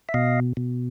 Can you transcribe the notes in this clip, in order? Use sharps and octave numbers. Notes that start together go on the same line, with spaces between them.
E5
B2 D#5 F5
B2